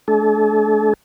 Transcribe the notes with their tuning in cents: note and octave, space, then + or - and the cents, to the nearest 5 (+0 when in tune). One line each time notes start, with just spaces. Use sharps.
A3 -40 D4 -25 A4 -40